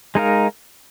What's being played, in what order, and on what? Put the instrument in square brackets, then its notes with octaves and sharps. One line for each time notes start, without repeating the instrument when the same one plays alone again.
[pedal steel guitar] G#3 D#4 A#4 F5